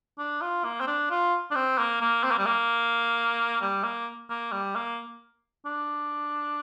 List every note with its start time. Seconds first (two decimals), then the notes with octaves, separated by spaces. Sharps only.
0.19 D4
0.42 F4
0.65 A#3
0.81 C4
0.87 D4
1.11 F4
1.51 D4
1.56 C4
1.79 A#3
2.01 A#3
2.24 C4
2.31 A#3
2.39 G3
2.47 A#3
3.61 G3
3.84 A#3
4.30 A#3
4.53 G3
4.76 A#3
5.66 D4